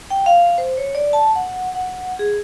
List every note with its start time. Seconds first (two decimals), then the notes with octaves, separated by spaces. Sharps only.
0.10 G5
0.26 F5
0.58 C5
0.77 C#5
0.95 D5
1.13 A5
1.35 F#5
1.75 F#5
2.19 G#4